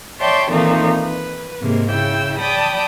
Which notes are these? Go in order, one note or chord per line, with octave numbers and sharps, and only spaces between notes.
C#5 D5 E5 G5 A5 C6
A#2 D#3 E3 A3 C4 D#4
B4
G#2 C3 G#3 A#3
C#3 E4 G5 E6
D5 G5 A5 B5 D#6